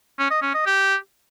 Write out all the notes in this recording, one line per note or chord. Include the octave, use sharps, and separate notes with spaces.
C#4
D#5
C#4
D#5
G4